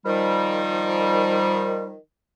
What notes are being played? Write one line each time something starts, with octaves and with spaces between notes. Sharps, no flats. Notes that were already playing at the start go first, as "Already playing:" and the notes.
D#3 F3 G3